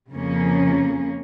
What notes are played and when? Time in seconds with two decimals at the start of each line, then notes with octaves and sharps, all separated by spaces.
0.12 F2 C#3 F3 A#3 C#4